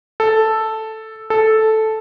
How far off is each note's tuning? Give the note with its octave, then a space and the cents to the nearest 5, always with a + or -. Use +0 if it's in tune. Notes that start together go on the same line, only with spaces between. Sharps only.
A4 +0
A4 -5